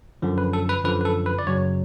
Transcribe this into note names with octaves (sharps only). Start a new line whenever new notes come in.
F#2 D3 F3
B4
A4
B4
F#2 D3 F3 B4
B4
A4
B4
D5
F#2 C#3 F#3 C#5